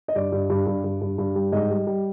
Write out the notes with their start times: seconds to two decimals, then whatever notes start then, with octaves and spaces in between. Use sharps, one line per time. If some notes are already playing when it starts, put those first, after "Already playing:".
0.08 D#5
0.15 G2 D5
0.32 G2
0.50 G2
0.67 G2
0.84 G2
1.01 G2
1.18 G2
1.35 G3
1.52 G#2 D#5
1.70 G3
1.87 G3